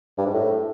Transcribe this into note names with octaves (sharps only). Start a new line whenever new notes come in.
G2
G#2
A2